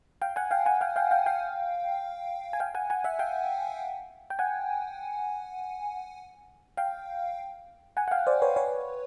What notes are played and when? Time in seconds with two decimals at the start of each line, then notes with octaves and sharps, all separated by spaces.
0.22 F5 G5
0.36 F#5 G#5
0.51 F5 G5
0.66 F#5 G#5
0.81 F5 G5
0.96 F5 G5
1.11 F5 G5
1.26 F5 G5
2.53 G#5
2.60 F5 G5
2.75 F#5 G#5
2.90 F#5 G#5
3.04 E5 F#5
3.19 F5 G5
4.30 G5
4.39 F#5 G#5
6.77 F5 G5
7.97 F#5 G#5
8.08 F#5
8.11 F5 G5
8.27 C5 D5
8.42 B4 C#5
8.56 B4 C#5